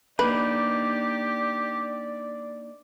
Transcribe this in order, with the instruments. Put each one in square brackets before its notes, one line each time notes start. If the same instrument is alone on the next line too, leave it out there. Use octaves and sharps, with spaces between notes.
[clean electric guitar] A#3 D4 D#4 [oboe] G4 [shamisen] B4 [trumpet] D5